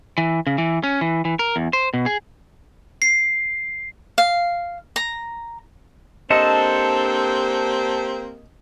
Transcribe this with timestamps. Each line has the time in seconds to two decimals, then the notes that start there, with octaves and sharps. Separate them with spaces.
0.18 E3
0.47 C#3
0.58 E3
0.83 C#4
1.01 E3
1.25 E3
1.39 A#4
1.56 E2
1.73 C5
1.94 B2
2.06 G#4
3.02 C7
4.18 F5
4.96 A#5
6.30 A#3 C4 D4 G4 A4 C5 D#5